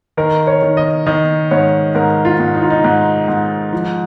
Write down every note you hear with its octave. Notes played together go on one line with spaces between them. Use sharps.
D#3 A#4
C#5
D#3
D#5
D#3 D#5
G#2 C#5
G#2 A#4
F4
G#2
D#4
F4
D#4
G#2
G#2
F3